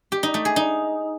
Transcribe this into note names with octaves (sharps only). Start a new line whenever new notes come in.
G4
D#4
A3
G#4
D#4